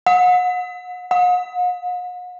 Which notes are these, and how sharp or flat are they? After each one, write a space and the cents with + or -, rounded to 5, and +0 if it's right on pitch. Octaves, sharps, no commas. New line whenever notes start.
F#5 -35
F#5 -45